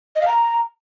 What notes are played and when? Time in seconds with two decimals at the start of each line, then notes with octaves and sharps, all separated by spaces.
0.16 D#5
0.22 F5
0.28 A#5